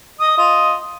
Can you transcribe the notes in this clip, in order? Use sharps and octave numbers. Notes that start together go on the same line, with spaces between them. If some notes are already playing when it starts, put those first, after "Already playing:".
D#5 D#6
F4 D#5